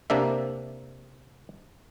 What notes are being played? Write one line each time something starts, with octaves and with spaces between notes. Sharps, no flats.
C3 A#3 D4 E5